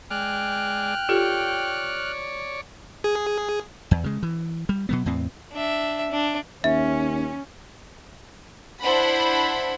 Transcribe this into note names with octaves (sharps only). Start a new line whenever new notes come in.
G#3 D5 G5 F6 F#6
F4 G4 A4 C#5 D5
G#4
E2
C#3 G#3
E3
G3
B2 F#3 B3
E2 A2 C4
D4 E5
D4
D#2 C#4 E5
D4 E4 C5 F#5 B5